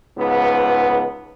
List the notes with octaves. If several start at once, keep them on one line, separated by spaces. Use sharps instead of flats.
C#2 G#2 B3